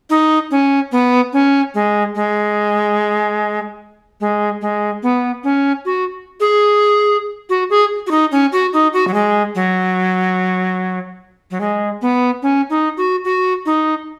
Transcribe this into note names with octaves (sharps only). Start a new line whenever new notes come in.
D#4
C#4
B3
C#4
G#3
G#3
G#3
G#3
B3
C#4
F#4
G#4
F#4
G#4
F#4
D#4
C#4
F#4
D#4
F#4
F#3
G#3
F#3
F#3
G#3
B3
C#4
D#4
F#4
F#4
D#4